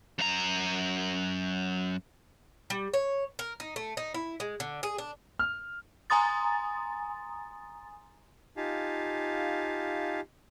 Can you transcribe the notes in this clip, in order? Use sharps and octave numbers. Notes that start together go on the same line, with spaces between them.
F#2 A#5
G3
C#5
A#4
D#4
A3
D#4
E4
G#3
D3
G#4
D4
F6
G#5 A#5 C6 D#6 A6
D#4 F4 G4 F5 G#5 A5